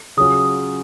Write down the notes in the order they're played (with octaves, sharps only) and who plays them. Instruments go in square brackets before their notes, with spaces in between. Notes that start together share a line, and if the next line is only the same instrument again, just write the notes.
[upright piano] C#3 F#3 C#4 F4 [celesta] D#6